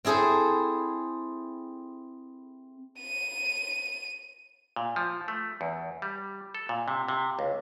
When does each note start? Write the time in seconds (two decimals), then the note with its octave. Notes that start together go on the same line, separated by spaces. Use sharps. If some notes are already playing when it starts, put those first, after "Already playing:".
0.05 C4 E4 G#4 A4 C5
3.01 D#7
4.76 A#2
4.96 F3
5.28 A3
5.61 E2
6.02 G3
6.55 A4
6.69 A#2
6.88 C3
7.09 C3
7.39 C#2